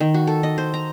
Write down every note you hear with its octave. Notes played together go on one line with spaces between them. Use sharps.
D#3
F#4
A4
D#5
C5
A#5